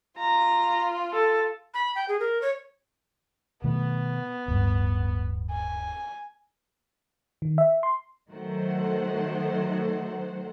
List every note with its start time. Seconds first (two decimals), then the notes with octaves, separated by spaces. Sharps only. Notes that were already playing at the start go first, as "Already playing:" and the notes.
0.19 F4 A#5
1.13 A4
1.74 B5
1.95 G5
2.09 G#4
2.20 A#4
2.42 C#5
3.64 B2 D#3 A3 B3
4.48 D1 G2
5.51 G#5
7.42 D#3
7.58 E5
7.83 C6
8.32 D#3 F#3 A3 C5 F#5